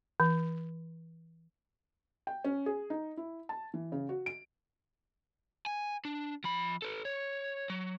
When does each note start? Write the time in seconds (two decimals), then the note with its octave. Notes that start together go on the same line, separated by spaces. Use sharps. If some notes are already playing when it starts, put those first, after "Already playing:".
0.20 E3
2.27 G5
2.44 C#4
2.66 G#4
2.90 D#4
3.17 E4
3.49 A5
3.74 E3
3.92 C#3
4.09 F#4
4.26 D7
5.66 G#5
6.05 D4
6.44 F3 B5
6.82 A4 B4
7.05 C#5
7.70 F#3